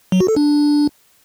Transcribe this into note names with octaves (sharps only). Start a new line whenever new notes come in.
F#3
F#4
A4
D4